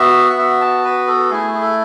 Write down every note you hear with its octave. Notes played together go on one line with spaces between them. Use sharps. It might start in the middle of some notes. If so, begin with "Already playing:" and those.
Already playing: B3 F#4 E5
F#5
E5
A5
B4
A4
A3 E4 G#4
G#4
A4